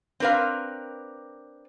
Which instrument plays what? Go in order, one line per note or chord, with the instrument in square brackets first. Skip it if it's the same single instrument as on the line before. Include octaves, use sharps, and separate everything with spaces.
[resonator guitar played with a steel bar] C4 D4 A#4 B4 F5